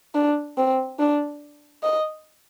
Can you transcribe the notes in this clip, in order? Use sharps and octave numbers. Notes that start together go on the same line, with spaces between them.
D4
C4
D4
D#5